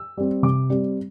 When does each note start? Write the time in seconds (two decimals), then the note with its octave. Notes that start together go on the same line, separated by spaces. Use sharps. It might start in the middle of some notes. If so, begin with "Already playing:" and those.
Already playing: E6
0.17 G3 C4
0.43 C3 D6
0.70 G3 C4